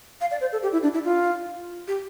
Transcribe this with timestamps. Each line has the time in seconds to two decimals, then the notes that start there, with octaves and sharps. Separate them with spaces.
0.21 F5
0.31 D5
0.41 C5
0.52 A4
0.63 G4
0.73 E4
0.83 D4
0.94 E4
1.04 F4
1.88 G4